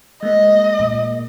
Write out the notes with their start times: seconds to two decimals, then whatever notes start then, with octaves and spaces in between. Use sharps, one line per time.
0.23 G#3 A#3 D#5
0.79 A#2